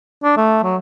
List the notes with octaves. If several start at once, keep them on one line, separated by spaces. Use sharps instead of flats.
D4
A3
F#3